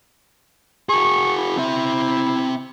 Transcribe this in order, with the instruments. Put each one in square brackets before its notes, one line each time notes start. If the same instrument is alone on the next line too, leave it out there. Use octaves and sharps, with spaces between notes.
[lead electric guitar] F#4 G#4 [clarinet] C#6
[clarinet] E4
[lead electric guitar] C4 E5